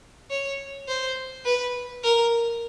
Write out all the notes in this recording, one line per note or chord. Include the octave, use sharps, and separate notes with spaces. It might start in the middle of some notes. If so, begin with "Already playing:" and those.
C#5
C5
B4
A#4